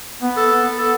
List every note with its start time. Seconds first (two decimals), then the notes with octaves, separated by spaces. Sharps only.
0.22 B3
0.37 A4
0.62 B3
0.78 A4